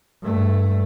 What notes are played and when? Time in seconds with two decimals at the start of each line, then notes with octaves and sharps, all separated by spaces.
0.22 G2 A3